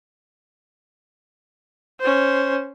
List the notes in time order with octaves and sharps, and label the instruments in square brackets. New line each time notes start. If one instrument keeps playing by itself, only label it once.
[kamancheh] C#4 C5